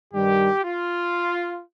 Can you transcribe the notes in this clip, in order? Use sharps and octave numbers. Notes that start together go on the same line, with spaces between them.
G2 D#3 G3 G4
F4